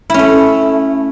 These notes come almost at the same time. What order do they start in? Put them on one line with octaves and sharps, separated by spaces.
E4 C#4 A3